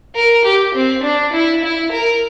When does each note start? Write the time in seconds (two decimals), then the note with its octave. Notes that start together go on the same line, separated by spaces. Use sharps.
0.15 A#4
0.45 G4
0.75 C4
1.03 D4
1.33 E4
1.63 E4
1.92 A#4